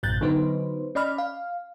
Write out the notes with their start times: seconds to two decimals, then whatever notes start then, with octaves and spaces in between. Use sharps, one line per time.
0.03 A1 F#2 B2 F#6 G6 A6
0.21 D3 F#3 B3 D#4 B4 C5
0.95 C#4 D5 D#5 B5 F6
1.18 F5